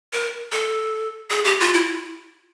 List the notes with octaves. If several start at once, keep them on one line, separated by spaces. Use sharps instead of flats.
A#4
A4
G#4
G4
F4
E4